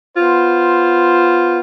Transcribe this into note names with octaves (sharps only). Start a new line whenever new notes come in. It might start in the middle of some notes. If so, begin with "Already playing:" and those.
B3 F4 C5